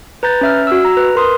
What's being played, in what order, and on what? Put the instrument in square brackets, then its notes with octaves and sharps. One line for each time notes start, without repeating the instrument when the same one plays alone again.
[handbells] B4 A#5 G6 A6
C#4 E5 F6
F#4 E6
A#5
B4
A#4 C6 D#6